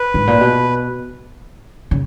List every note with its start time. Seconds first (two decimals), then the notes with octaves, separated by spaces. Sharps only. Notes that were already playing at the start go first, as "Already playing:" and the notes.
Already playing: B4
0.14 G#2
0.27 A#2
0.41 B2
1.91 C#3